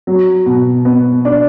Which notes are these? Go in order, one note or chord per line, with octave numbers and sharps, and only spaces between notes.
F#3
B2
B3
D4